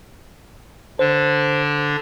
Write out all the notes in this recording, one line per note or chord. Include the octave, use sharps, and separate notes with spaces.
D3 D4 C5